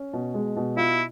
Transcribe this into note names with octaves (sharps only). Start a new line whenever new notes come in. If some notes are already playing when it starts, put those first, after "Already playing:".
Already playing: C#4
B2
G#3
B2
E4 F4